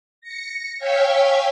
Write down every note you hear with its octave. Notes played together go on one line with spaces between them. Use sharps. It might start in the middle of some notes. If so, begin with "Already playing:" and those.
A#6 C#7
C#5 F5 G5 G#5 E6 B6